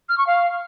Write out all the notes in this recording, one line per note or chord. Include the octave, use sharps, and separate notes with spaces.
F6
C#6
F5